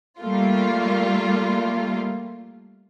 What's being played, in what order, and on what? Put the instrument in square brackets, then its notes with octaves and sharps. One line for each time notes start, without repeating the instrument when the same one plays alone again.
[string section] G3 A3 A#3 F4